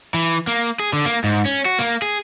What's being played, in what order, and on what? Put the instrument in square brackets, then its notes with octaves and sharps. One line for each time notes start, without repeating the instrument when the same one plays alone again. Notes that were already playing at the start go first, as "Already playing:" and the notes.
[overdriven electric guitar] E3
A#3
G#4
D3
A#3
G#2
C#4
F#4
A#3
G#4